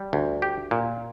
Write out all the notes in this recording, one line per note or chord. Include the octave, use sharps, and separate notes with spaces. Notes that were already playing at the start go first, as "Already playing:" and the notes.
Already playing: G3
D2
G4
A#2